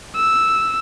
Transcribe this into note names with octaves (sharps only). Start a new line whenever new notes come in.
E6